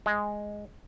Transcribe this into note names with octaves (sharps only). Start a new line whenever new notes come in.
G#3